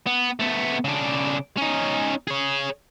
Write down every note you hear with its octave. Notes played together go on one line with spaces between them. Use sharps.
B3
A3 B3
C#3 D4
C#4 D#4
G#4 C#5